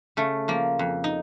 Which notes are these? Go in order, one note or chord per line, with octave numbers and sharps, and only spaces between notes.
C#3 A3
F3 A#3
F2
D#4